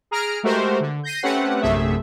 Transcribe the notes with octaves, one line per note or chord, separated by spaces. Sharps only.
G#4 A#5 F6 D7
G#3 A3 F#4 G4 A#4 C5
D3
G6 A#6 C7 D#7
A3 C4 C#4 G4 B4 F#5
A#1 F#2 C3 A3 G#4 E5